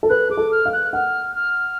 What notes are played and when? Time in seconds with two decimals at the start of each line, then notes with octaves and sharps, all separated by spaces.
0.03 A4
0.09 B4 F#6
0.30 G#4 D6
0.37 A4
0.52 F6
0.66 F5
0.72 F#6
0.93 F#5 F6
1.35 F6